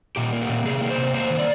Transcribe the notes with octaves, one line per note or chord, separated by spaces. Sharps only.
A#2 G4
A#3
G4
A#2
C3 G#4
A#3
C5
C3
A#3 C5
D#3
D5